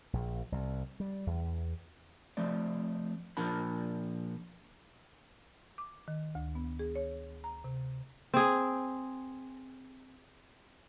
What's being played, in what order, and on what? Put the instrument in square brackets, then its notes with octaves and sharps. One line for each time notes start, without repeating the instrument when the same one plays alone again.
[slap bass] A#1
C2
G3
E2
[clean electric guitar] F3 A3 C4 D5
A#2 F3 D4 A#4 A5 B5
[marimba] D6
D#3
D2
B3
G#4
C#5
A#5
C3
[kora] C4 G#4